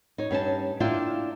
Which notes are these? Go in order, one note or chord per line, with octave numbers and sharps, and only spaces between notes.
D#4 C#5
G2 C#4 D#4 A5
A#3 D4 E4 F4 D5 G5